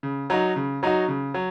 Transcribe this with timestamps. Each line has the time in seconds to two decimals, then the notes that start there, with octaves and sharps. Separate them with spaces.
0.03 C#3
0.30 F#3 D#4 F#4
0.56 C#3
0.83 F#3 D#4 F#4
1.08 C#3
1.34 F#3